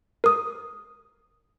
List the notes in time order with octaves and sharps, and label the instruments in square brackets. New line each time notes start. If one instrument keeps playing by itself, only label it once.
[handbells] A#4 D#6